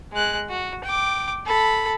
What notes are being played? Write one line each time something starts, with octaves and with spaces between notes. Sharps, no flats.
G#3 F#6
F#4
G5 D6
A4 B5